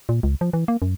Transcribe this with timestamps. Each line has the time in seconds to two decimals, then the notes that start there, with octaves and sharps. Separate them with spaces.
0.09 A#2
0.23 C#2
0.41 F3
0.53 E3
0.68 A#3
0.82 F#2